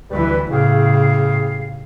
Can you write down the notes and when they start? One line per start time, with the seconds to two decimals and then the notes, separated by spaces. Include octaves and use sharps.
0.11 D2 E3 G3 B4
0.51 A2 C#3 G4 G#4 F5